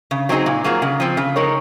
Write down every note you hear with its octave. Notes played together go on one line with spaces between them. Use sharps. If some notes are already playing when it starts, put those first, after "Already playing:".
C#3
F#3 C4 D#4 G#4
A#2
F#3 A#3 F4 G#4
C#3
F3 C4
C#3
G#3 D#4 A#4 C#5